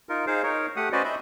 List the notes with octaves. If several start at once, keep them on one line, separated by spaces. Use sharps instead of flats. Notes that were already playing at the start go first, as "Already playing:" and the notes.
D#4 F4 A#4
D#4 G#4 C5 F5
D#4 A#4 C#5
A3 G4 F#5 D#6
C#4 F#4 B4 C5 D5 D#5
D#5 E5 B5